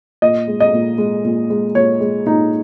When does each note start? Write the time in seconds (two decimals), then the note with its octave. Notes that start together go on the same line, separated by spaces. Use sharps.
0.22 A#2 D#5
0.48 G#3
0.60 D#5
0.73 A#2
0.98 G#3
1.24 A#2
1.50 G#3
1.75 A#2 C#5
2.00 G#3
2.26 A#2 D#4